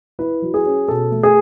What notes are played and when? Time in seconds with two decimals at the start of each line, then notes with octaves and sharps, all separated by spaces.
0.19 E4 B4
0.42 F#3
0.54 G#4
0.66 C#4
0.88 B2 A4
1.12 A3
1.23 G#4